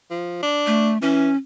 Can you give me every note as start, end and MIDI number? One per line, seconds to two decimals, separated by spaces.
0.11 0.39 53
0.43 0.92 62
0.67 0.98 57
1.02 1.30 52
1.02 1.36 61